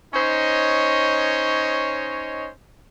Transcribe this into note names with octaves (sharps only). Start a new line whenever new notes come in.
C#4 D#4 C5 C#5 D#5